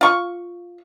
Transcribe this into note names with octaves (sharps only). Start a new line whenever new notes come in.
F4 C#6